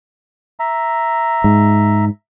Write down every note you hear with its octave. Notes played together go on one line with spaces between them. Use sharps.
E5 A#5
G#2